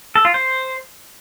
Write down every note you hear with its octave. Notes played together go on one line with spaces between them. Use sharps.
A4
F4
C5